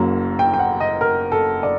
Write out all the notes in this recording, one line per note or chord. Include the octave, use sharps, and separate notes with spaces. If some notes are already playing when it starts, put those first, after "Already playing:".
Already playing: F#1 F#2 F#3 A#3
G5
G5
F#5
D#5
A#4
A4
D5